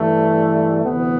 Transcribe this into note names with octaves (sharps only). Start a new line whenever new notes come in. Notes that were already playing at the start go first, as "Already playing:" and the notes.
Already playing: G2 E3 A3
D2 C3 E3 B3